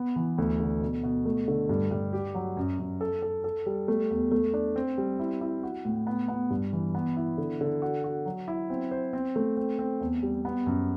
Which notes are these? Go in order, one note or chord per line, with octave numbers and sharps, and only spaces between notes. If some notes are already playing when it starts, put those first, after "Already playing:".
Already playing: B3
E3
D2
D3
B2
B2
A3
D3
G2
G2
G4
F#3
F#2
F#2
A4
A4
A4
G3
A3
E2
A3
D4
C4
G3
E4
E4
F#4
A2
B3
B3
G2
E3
B3
E4
D3
D3
F#4
F#4
F#3
E4
C4
C5
C4
A3
C4
C4
E2
G3
B3
F#2